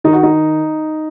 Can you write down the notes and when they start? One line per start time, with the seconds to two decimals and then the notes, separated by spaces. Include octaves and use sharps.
0.04 D#3 D#4
0.13 F#4
0.23 D#4